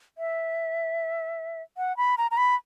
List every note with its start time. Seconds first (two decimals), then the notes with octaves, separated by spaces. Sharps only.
0.18 E5
1.77 F#5
1.97 B5
2.18 A#5
2.31 A#5
2.37 B5